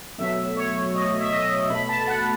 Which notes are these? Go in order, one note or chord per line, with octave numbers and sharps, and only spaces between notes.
B2 F#3 A3 E5
C#5
D#5
E5
D#5
B2 A3 B5
A5
F#5